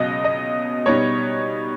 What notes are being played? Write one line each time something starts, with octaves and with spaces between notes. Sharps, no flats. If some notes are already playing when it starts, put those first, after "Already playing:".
Already playing: C#2 B2 F#3 B3 D#5
D#5
B2 G3 B3 D#4 C#5